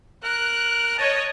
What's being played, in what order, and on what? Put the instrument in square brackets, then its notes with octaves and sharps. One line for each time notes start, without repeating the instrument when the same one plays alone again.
[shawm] A#4 [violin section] F#6
[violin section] C#5 D#5 [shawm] A5